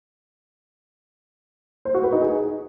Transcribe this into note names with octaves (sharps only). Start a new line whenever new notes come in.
C5
F#4
B4
D#4
G#4